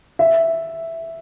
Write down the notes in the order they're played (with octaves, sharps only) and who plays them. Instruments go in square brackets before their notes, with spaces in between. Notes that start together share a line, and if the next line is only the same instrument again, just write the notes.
[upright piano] E5